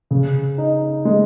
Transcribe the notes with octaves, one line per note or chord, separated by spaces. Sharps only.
C#3
D#4
G#3